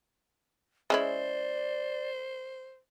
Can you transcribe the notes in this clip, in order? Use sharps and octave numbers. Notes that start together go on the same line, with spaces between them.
G#3 C#4 E4 C5 D5